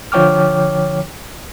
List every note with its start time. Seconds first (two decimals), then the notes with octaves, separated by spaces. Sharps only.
0.12 D3 F3 C#5 G5 D6 F6